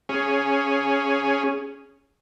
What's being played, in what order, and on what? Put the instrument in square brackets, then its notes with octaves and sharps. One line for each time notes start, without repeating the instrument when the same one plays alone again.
[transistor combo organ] C#4 G#4